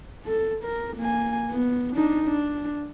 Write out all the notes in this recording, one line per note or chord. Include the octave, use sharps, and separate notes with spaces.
A4
A#4
A#3 G#5
B3
D4 D#4
D4